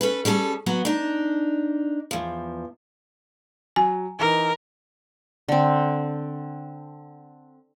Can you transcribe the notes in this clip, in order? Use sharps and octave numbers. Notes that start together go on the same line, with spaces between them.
C#4 A4 B4
G3 C#4 G#4 A4
F#3 B3 F#4
D4 D#4
E2 F3
F#3 G#5
E3 D#4 A#4
D3 C4